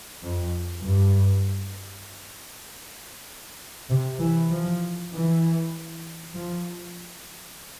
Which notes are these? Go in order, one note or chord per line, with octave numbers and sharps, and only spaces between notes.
F2
G2
C3
E3
F3
E3
F3